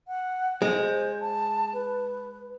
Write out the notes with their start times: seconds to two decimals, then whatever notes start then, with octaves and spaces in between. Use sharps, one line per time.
0.08 F#5
0.62 G#3 C5
1.21 A5
1.74 B4